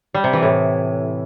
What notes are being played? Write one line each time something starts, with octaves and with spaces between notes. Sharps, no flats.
G3
C3
E3
A2